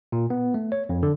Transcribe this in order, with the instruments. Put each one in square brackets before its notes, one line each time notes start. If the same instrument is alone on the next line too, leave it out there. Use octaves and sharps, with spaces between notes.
[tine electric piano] A#2
B3
A3
C#5
F2
D3